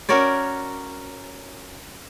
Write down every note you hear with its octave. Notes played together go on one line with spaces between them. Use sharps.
C#4 F#4 A#4 C#5 D5